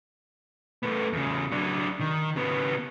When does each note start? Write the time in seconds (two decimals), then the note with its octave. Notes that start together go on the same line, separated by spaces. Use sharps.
0.83 A3 B3
1.13 E2 C#3
1.52 F#3 D4
2.00 D#3
2.36 C#3 B3